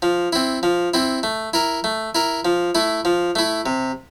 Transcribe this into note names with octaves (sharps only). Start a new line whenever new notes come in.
F3
C4 E4
F3
C4 E4
A3
E4 A#4
A3
E4 A#4
F3
A3 E4
F3
A3 E4
C3